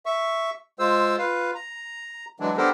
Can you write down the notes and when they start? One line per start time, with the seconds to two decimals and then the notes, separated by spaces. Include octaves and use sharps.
0.06 E5 C#6
0.79 G#3 F4 C5 E6
1.18 F4 B4 F5
1.55 A#5
2.40 E3 F#3 G#3 D4
2.57 B3 D4 G4 A4 A#4 C5